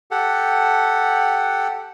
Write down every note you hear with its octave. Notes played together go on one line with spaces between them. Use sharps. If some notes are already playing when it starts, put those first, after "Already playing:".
G4 A4 F#5